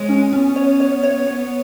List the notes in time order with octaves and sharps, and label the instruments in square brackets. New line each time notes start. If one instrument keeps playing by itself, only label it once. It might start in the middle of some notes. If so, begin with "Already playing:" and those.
Already playing: [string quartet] G#3 [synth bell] C#5
[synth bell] C#4
[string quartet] B3 [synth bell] C#4
[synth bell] C#5
C#5
C#5
C#5